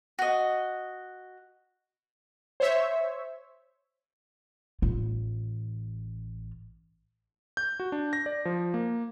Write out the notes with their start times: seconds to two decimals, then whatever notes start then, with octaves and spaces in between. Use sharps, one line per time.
0.19 F#4 D#5
2.60 C5 C#5 E5
4.82 A1 F4
7.57 G6
7.80 F#4
7.92 D4
8.13 A#6
8.26 D5
8.45 F3
8.74 A#3